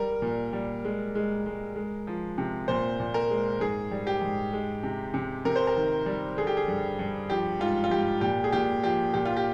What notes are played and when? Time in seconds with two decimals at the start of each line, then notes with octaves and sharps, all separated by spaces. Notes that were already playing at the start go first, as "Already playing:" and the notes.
Already playing: G3 A#4
0.22 A#2
0.53 G3
0.84 G#3
1.15 G#3
1.46 G#3
1.76 G#3
2.07 F3
2.38 C3
2.68 A#2 C5
3.00 A#2
3.14 A#4
3.30 G#3
3.60 G#2 G#4
3.91 G3
4.07 G4
4.22 G#2
4.53 G#3
4.83 C3
5.14 C3
5.45 C3 A#4
5.56 C5
5.67 A#4
5.76 D#3
6.06 G3
6.37 D3 G#4
6.47 G4
6.57 G#4
6.68 G2
6.99 G2
7.30 F3 G4
7.60 G#2 F4
7.84 F4
7.91 G#2 G4
8.21 A#2 G4
8.44 G#4
8.52 A#2 G4
8.83 F3 G4
9.14 A#2 G4
9.25 F4
9.37 G4